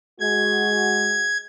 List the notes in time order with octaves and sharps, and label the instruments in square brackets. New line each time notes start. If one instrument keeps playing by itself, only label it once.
[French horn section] G#3 F#4 [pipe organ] G#6